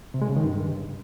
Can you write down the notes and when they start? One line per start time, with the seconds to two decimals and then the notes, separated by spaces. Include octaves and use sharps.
0.14 C3
0.22 G#3
0.29 C#3
0.37 D#3
0.44 G2